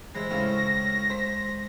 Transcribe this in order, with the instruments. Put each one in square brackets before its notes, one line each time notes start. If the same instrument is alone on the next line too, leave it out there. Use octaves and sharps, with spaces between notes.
[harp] E3 C5 E5 [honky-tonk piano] G#3 [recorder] A#6
[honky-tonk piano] A2 C#3 [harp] G#3 F5 C#6
[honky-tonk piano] C5 B6